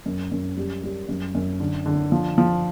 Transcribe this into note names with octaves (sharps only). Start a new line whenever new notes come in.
F#2
F#2
G3
G3
F#2
F#2
D3
D3
F3
F3